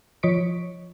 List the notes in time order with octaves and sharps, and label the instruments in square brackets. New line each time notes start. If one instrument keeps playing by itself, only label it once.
[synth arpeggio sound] F3 C#5 D#5 C#6 B6 D7